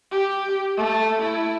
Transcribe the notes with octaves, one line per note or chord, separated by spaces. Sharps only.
G4
A3
E4